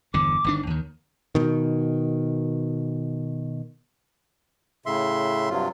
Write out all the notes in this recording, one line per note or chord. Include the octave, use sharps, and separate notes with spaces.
G1 E2 D3 D6
G1 D#3 D4
D#2 D#3
B2 D#3
A2 C#3 E5 C6
G2 C3 F#3 F4